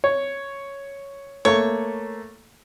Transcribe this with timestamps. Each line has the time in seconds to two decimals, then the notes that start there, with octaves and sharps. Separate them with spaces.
0.04 C#5
1.45 A3 A#3 C#5